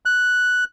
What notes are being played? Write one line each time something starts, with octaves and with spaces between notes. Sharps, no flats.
F#6